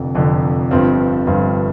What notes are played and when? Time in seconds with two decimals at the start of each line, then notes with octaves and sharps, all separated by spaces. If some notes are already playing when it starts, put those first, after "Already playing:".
Already playing: F1 F2 D3 F3
0.15 F1 F2 D3 F3
0.71 G1 G2 F3 C4 F4
1.27 G1 G2 F3 C4 F4